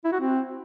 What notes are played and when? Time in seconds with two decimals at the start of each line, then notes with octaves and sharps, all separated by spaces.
0.05 E4
0.12 F#4
0.20 C4